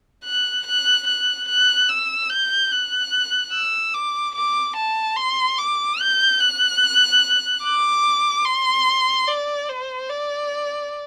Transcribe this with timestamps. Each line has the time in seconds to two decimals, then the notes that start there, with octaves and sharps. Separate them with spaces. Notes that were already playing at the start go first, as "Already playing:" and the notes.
0.24 F#6
0.66 F#6
1.07 F#6
1.48 F#6
1.89 E6
2.30 G6
2.71 F#6
3.53 E6
3.94 D6
4.36 D6
4.77 A5
5.17 C6
5.58 D6
6.00 G6
6.40 F#6
7.64 D6
8.45 C6
9.28 D5
9.69 C5
10.10 D5